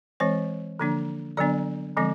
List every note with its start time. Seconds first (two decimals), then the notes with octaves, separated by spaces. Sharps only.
0.20 E3 G#3 C4 C#5
0.79 D3 F3 A#3 D4
1.37 D3 F#3 B3 D4 D5
1.97 D3 F3 G#3 C4